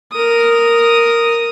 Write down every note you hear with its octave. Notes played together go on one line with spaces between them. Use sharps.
A#4 D#6